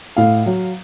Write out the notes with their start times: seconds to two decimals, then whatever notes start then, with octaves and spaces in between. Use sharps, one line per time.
0.17 A2 F5
0.46 F#3